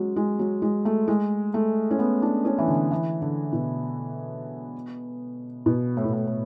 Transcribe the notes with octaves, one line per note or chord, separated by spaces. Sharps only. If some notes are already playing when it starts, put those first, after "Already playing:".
Already playing: F#3 G#3 C#4
G#3
F#3
G#3
A3
G#3
A3
C#4
B3
D4
C#4
E3
D3
E3
D3
B2
B2
A2
B2
A2
A2